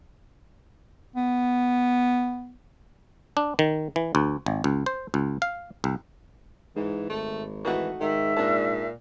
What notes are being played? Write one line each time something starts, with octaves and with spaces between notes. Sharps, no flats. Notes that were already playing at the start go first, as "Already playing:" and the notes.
B3
D4
D#3
E3
D2
G#1
C#2
C5
C#2
F5
C2
G#2 E3
G#1 A3
E3 A3 D#4 F#4
G#2 D#3 E5
A#2 D4 A5